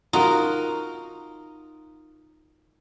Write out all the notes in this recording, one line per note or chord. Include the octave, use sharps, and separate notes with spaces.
D#4 F4 F#4 A#4